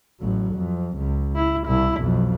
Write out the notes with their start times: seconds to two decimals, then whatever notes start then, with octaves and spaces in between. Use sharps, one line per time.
0.20 A1 F#3
0.55 F2
0.98 C#2
1.36 E4
1.67 C2 E4
1.99 B1 F2